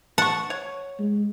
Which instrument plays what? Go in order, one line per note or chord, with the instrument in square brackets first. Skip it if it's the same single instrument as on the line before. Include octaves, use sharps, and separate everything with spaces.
[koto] F#5 [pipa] A5 C#6
[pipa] C#5
[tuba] G#3